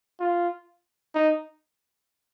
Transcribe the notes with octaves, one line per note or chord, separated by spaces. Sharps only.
F4
D#4